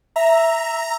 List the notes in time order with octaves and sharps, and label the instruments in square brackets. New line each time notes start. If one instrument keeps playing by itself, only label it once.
[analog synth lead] E5 [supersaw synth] A#5